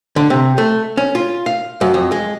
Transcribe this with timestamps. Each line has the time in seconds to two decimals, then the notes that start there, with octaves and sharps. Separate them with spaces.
0.16 D3
0.30 C3
0.58 A3
0.97 C#4
1.15 F4
1.46 F5
1.81 F#2
1.94 F2
2.12 G#3